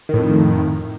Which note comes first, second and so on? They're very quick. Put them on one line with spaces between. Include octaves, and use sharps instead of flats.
D#3 A2 F2